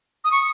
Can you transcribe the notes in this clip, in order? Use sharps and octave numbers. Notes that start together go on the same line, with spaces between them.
D#6
C#6